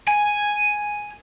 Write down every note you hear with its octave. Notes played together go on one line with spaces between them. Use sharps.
G#5